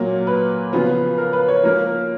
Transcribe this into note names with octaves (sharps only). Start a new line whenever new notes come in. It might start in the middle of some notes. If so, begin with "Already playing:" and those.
Already playing: A#2 F#3 A#3
B4
C#3 F3 B3
A#4
B4
C#5
F3 A#3 C#4 A#4
A#4